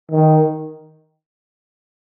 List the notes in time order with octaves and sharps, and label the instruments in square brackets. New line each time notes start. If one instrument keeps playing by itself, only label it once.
[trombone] D#3